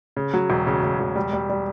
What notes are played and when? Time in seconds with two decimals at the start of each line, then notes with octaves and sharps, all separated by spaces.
0.16 C#3
0.34 F#3
0.50 E1
0.67 C#3
0.83 C#3
1.00 E1
1.16 G3
1.33 G3
1.50 G3